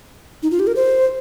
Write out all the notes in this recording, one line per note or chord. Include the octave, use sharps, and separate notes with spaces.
D#4
F4
G4
A#4
C5